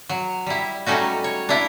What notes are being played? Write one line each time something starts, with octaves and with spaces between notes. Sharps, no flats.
F#3
G3 E4
F#3 G3 A3 C#4 D#4 F#4
C#5
D4 E4 F4